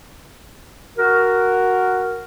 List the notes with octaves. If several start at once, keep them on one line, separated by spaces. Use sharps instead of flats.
F#4 A#4